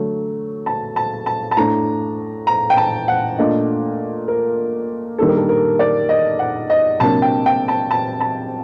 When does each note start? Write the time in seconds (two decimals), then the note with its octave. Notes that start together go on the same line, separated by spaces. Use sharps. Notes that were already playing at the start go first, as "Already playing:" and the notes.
Already playing: D3 F#3 A3
0.66 A5
0.96 A5
1.26 A5
1.51 A5
1.57 A2 A3 D4 A#5
2.47 A#5
2.70 G5
2.77 A5
3.08 F#5
3.39 A#2 A3 D4 D#5
4.28 A#4
5.19 D#3 G3 A#3 D4 A4
5.28 A#4
5.37 A4
5.49 A#4
5.79 D5
6.09 D#5
6.39 F#5
6.70 D#5
7.00 C3 F#3 A#3 D4 A5
7.22 G5
7.46 G5
7.68 A5
7.91 A5
8.21 A5